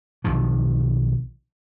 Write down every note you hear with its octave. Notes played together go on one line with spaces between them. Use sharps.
B1 C3 D#3 F3